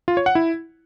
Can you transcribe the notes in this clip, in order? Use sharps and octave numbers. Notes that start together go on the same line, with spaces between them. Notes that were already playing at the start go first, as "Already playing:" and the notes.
F4
C#5
F#5
E4